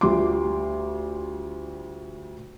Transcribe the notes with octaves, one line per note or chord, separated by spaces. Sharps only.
D2 G3 F4 C6 D6